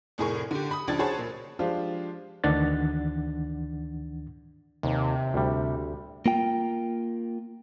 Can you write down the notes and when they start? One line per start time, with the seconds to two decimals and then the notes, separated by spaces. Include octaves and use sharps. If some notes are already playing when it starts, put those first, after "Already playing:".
0.18 F1 A2 G#4 A#4 C#6
0.51 D3 G4
0.71 B5 D#6
0.88 C#2 F3 D4 D5 G#6 A6
0.99 F#4 G#4 C5 C#5 A5 B5
1.19 A#2
1.59 F3 G#3 D4 F4 G4 C5
2.44 D2 D#3 E3 D4 F#5 A6
4.83 D#2 C3
5.34 D2 G3
6.26 A#3 F4 G5